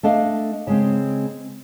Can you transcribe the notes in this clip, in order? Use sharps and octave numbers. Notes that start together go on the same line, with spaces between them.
A3 D4 D#5 F5
C#3 G#3 C4